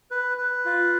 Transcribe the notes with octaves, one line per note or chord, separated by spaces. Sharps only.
B4
B4
F4